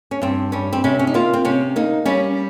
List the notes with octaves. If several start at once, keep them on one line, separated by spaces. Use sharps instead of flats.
C#4
G2 C4
G3 C#4
C4
C3 C#4
C#4
D#4
A#3 F4
C4
C3 C#4
A#3 D#4
G3 C#4